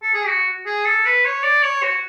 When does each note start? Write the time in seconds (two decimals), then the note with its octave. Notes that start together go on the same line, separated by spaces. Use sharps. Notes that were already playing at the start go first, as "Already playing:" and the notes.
0.02 A4
0.14 G#4
0.27 F#4
0.66 G#4
0.85 A4
1.05 B4
1.25 C#5
1.43 D5
1.63 C#5
1.83 F#4